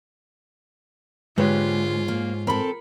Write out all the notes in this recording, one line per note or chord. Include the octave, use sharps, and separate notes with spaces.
G#2 D3 G#3 A#3 F4 G4 B4 C#5
A#3
C4 A4 A#4 B5